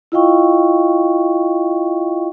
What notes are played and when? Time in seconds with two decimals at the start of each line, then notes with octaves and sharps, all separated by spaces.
0.12 E4 F4 D#5 F5 G5 C#6